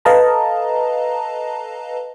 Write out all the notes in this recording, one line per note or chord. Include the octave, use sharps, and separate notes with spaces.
A4 B4 D#5 F5 A5 A#5